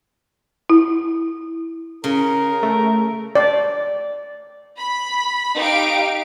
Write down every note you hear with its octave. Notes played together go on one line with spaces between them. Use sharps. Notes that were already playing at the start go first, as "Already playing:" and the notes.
E4
C#3 A#4
A3
D5
B5
D#4 G4 F5 D7